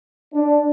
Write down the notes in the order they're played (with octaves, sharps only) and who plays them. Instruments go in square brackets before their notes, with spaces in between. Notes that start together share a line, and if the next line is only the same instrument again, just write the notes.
[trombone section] D4